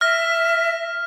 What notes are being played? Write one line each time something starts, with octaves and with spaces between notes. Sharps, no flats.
E5 F6 A#6